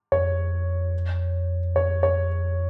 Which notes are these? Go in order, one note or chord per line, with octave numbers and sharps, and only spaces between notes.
F2 C#5
C#5
C#5